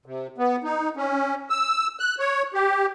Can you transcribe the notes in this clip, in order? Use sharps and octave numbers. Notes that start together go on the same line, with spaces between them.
C3
B3
D#4
C#4
E6
F#6
C#5
G4